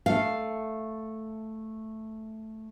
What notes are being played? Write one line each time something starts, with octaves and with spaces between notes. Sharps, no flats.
A3 F5